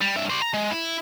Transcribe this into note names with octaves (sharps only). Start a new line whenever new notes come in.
G3
G2 E5
C5 D5
A#5
G#3
E4